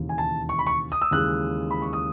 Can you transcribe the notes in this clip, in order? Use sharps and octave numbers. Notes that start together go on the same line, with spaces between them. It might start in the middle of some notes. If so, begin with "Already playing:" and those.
Already playing: E1 D#2 C#3 E3
G#5
A5
C#6
B5
C#6
D#6
E6
D#2 C#3 E3 G#3 F#6
B5
C#6
D#6